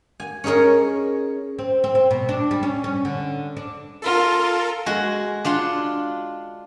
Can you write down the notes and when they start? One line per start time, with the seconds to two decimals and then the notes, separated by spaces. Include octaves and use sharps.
0.20 G#5
0.44 C#4 D#4 G#4 A#4 C#5
1.59 C4
1.84 C4
1.95 C4
2.11 B2
2.29 D4
2.51 G3
2.63 C#4
2.84 C#4
3.05 D3
3.57 D4
4.02 F4 A4 A#4
4.86 G#3 F#4
5.45 D4 F4 F#5 C6